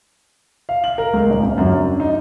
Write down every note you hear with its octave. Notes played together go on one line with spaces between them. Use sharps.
F5
F#7
A#4
C#2
D#1
C#3
F#2
D4
D#4